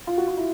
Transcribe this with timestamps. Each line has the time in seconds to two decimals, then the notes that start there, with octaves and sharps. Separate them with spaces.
0.07 F4
0.18 F#4
0.27 F4
0.37 E4